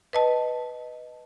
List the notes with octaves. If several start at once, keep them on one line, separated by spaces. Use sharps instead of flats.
B4 D#5 A5